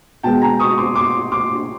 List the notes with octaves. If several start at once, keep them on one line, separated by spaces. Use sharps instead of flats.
B2 G#3 B3 G5 A5
G#5 A#5
C#6 D#6
C6 D6
C6 D6
C6 D6